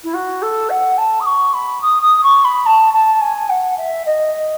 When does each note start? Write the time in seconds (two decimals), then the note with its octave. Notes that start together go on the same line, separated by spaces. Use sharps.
0.03 E4
0.13 F#4
0.42 A4
0.69 F#5
0.97 A5
1.20 D#6
1.25 C#6
1.53 B5
1.81 D#6
2.02 D#6
2.23 C#6
2.44 B5
2.65 A5
2.93 A5
3.21 G#5
3.49 F#5
3.77 E5
4.05 D#5